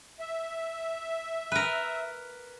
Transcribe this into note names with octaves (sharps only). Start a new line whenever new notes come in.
E5
A#4 B4